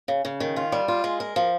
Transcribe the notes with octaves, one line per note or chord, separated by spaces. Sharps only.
C#3
C#3
D#3
F4
G3
F4
G#3
A#4
F3